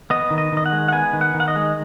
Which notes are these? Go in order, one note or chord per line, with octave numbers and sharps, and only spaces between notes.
B3 D#5
D#3
D#5
D#3 D#5
F#5
G#3
F#5
B3 G#5
D#3
F#5
D#3
F#5
D#5
G#3